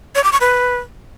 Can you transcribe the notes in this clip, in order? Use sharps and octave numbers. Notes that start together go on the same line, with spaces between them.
C#5
D6
C#6
B4